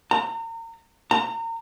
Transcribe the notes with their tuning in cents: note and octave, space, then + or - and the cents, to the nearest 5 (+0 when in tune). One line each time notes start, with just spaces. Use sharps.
A#5 -35
A#5 -30